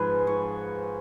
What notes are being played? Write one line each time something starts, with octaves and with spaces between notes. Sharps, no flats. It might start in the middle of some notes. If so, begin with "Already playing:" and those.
Already playing: G#2 F3 G#4 B4
C#5